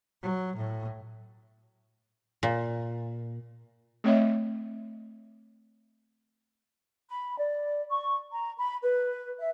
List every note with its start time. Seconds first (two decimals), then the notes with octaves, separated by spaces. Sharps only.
0.22 F#3
0.56 A2
2.43 A#2
4.04 A3 C4 C#5 D#5 E5
7.10 B5
7.38 D5
7.91 C#6
8.32 A#5
8.58 B5
8.83 B4
9.39 E5